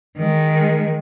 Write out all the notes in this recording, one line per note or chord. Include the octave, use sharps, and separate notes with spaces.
D#3 G#3